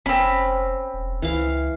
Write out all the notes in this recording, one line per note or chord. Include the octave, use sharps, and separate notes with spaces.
F1 C4 C#4 B5
E1
C#2 E3 F5